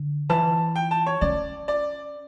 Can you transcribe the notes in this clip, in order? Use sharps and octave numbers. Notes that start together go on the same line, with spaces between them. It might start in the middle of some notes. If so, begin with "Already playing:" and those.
Already playing: D3
E3 A5
G5
A5
C#5
C#4 D5
D5